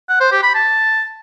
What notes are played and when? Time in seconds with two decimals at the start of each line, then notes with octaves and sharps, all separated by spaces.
0.09 F#5
0.20 C5
0.32 G4
0.43 B5
0.55 A5